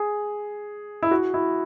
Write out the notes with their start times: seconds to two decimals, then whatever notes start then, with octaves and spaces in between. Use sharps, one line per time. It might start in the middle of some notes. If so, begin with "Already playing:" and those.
Already playing: G#4
1.03 E4
1.11 F#4
1.34 E4